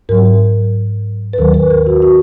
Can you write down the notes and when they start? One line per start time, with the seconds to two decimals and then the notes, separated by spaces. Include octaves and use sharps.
0.09 G#2 F#3 A#4
1.33 B4
1.38 D#2 D#3 F#3 A#4
1.54 B4
1.70 A#4
1.87 F#4
2.02 F#4